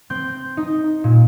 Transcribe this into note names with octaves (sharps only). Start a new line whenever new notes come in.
C4 G6
D#4
A#2